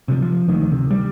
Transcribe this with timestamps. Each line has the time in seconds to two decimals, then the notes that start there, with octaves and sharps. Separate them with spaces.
0.08 C3 D#3 F3
0.22 F3
0.48 D2 D#3
0.72 C3
0.91 G3